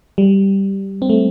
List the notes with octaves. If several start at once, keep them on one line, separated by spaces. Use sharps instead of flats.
G3
C4
A3